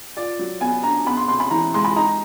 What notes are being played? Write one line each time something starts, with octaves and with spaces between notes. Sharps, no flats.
F4 D5
F#3
B3 G#5
D4 A#5
B3 B5
C6
C3 C6
B5
E3 A#5
G#3 C6
B5
D#4 A#5